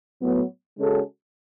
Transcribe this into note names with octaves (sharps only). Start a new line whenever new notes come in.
A2 F#3 B3
C#3 G#3 C#4 F#4 A4